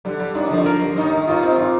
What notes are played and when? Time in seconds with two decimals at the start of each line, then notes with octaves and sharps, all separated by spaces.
0.05 D3 G3
0.20 G3
0.35 D#2 D#3 D4
0.50 F2 D3 F3
0.66 A#4
0.81 G3
0.91 F3
0.96 D#2 D#3 D#4
1.12 D#4
1.27 D#2 D#3 F4
1.43 C4
1.58 A#2 F4